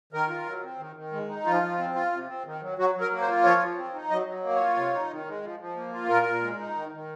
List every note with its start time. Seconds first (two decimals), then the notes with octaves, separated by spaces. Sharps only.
0.13 D#3 A#4
0.29 F4
0.46 F#3
0.63 C4
0.79 D#3
0.96 D#3
1.12 G#3
1.29 D#4
1.46 F3 F4
1.63 F3
1.78 C4
1.95 F4
2.12 C3
2.28 C4
2.46 D#3
2.62 F#3
2.78 F#3 F#4
2.95 F#3
3.01 A#4
3.12 A#3
3.22 C5
3.28 F4
3.44 F3 C#5
3.61 F3
3.77 C4
3.94 D#4
4.10 F#3 D#5
4.27 F#3
4.44 A#3
4.55 F4 C#5
4.76 C3
4.93 D#4
5.11 D#3
5.27 G#3
5.43 F3
5.59 F3
5.76 A#3
5.93 F4
6.09 A#2 A#4
6.26 A#2
6.42 G#3
6.59 D#4
6.75 D#3
6.92 D#3